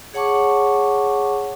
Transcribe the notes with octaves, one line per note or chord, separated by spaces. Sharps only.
G#4 C#5 F#5 A5 C#6 D6